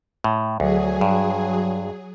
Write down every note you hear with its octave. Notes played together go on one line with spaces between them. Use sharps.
A2
D2 F#3 G#4
G2